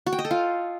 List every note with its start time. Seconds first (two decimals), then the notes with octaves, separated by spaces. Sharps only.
0.06 F#4
0.13 G5
0.19 D#5
0.25 A4
0.31 F4